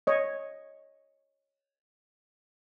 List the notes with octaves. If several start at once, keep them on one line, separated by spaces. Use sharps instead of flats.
C#5 D#5